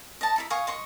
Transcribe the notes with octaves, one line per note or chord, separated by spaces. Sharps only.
D#5 A5
D#4 E4 B5
F5 G#5 C#6 D#6
D#5 C6 C#6